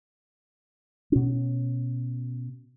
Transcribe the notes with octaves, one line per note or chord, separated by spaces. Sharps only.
B2 C#4